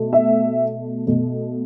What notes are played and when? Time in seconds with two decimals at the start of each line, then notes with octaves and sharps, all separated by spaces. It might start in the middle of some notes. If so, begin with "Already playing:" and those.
Already playing: B2 A3
0.13 E5
1.07 B2 A3